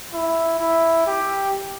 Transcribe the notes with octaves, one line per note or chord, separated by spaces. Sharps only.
E4
E4
G4